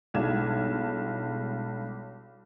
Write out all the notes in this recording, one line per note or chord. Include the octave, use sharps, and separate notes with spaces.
B1 G2 G#3 E4 G#6 E7